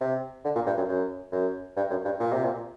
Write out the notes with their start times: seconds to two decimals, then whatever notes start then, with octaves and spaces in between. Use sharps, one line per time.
0.01 C3
0.44 D3
0.55 A#2
0.66 G2
0.77 F#2
0.88 F#2
1.32 F#2
1.76 G2
1.90 F#2
2.05 G2
2.19 A#2
2.32 C3
2.44 A#2